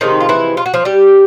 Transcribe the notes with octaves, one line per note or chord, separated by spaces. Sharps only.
C3 D#3 F3 G#3 C4 D#4
F4
E3 E4
F4
F#4
F3 F4
G3 G4